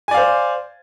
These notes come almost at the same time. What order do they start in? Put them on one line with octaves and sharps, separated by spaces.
G#5 D5 F5 C5